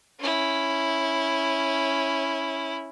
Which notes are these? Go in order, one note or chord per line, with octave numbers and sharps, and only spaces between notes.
C#4 E4